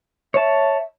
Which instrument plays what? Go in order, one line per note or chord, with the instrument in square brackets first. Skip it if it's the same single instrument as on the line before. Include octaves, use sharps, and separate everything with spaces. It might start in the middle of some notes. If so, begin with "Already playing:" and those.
[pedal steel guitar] C#5 A5 [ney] E5